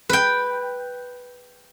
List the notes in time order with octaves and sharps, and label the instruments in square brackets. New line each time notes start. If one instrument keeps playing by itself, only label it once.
[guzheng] B4 G5